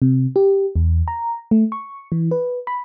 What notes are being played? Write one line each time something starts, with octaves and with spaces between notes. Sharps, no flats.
C3
G4
E2
A#5
A3
C#6
E3
B4
B5